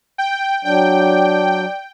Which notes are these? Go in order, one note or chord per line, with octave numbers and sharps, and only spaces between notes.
G5
F#3 D4 D5 G5